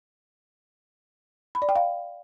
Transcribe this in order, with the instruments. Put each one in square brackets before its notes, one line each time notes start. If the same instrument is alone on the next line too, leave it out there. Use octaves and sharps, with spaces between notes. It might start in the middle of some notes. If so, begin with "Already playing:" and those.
[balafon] B5
D5
G5
F5